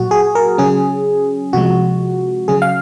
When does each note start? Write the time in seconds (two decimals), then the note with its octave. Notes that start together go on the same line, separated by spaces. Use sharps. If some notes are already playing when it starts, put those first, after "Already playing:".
Already playing: A#2 F#3 F#4
0.11 G#4
0.35 A#4
0.58 C#3 F#3 C#4 G#4
1.53 C3 F3 G#3 F#4
2.48 C#3 F#3 C#4 G#4
2.62 F5